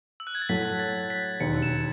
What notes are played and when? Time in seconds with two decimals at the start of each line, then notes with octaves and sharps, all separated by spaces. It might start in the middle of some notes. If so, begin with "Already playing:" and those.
0.20 E6
0.27 F#6
0.35 G#6
0.42 A6
0.49 A2 F#3 A3 B6
0.80 A6
1.10 B6
1.40 E1 D#2 D#3 C#7
1.63 E7